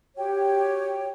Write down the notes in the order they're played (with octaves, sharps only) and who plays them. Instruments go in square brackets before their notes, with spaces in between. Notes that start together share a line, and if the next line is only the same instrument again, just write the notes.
[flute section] F#4 G4 C#5 G5